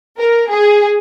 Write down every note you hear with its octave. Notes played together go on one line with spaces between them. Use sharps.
A#4
G#4